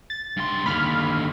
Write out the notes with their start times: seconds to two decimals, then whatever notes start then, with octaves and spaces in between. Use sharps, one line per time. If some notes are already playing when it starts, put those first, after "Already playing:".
0.10 A6
0.37 G2 C6
0.66 D#2 D3 B5 F6